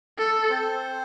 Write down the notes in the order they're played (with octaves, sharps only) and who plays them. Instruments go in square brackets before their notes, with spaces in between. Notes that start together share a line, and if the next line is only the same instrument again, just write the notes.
[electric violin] A4
[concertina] C4 C5